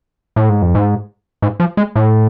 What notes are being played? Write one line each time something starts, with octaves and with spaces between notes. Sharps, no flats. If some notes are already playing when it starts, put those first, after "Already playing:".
A2
G#2
F2
G#2
G#2
F3
G#3
A2